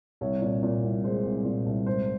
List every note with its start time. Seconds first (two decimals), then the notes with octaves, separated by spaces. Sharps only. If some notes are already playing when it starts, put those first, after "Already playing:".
0.21 C2 C#5
0.41 A#2
0.63 A#2
0.83 C2
1.04 G#3 C5
1.25 C2
1.45 A#2
1.66 C2
1.86 G#2 C5